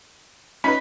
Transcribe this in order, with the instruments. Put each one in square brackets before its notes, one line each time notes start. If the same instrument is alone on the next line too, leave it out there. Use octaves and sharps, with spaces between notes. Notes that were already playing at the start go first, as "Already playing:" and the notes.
[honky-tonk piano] C#4 D#4 B4 [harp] B5